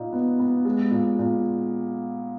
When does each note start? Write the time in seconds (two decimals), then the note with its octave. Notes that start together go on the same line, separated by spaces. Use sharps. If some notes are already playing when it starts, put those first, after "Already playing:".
Already playing: A#2 D#4
0.13 B3
0.39 B3
0.65 G#3
0.91 A#2
1.19 A#2